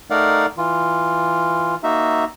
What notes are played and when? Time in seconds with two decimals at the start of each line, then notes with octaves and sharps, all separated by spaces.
0.10 A3 D#4 A#4 D5 F5 F#5
0.58 E3 F4
1.83 A#3 D#4 F#4 E5